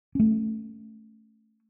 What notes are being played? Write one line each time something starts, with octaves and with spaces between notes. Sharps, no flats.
A3 C#4